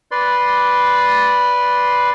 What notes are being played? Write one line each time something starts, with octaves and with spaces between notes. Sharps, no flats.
B4 D5 C6